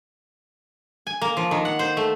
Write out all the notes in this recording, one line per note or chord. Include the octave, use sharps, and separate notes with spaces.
G#5
A#3
F3
D#3
F#5
C5
A3